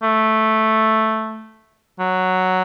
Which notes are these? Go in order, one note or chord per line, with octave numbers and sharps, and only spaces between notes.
A3
F#3